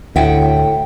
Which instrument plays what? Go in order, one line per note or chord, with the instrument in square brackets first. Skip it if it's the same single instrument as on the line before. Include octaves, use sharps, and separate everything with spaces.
[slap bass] D2 [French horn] A2 [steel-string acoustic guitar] E5 F#5 G5